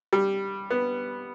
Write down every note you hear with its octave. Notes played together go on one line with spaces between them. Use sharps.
G3
B3